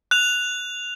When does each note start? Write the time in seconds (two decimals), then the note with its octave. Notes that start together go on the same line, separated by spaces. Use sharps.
0.11 F#6 F7